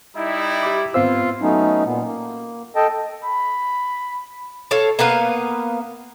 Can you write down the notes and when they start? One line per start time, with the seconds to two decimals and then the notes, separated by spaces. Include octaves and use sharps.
0.17 G3 D#4 E4
0.63 G4 B5 D6
0.94 G#2 B3 C4 F4 C5 F5 E6
1.41 F#3 A3 B3 C#4 D#4
1.85 A#2 B3
2.05 A#3
2.76 A4 D#5 G5 A5
3.25 B5
4.71 A4 C#5 F5
4.99 A#3 B3 B4 F5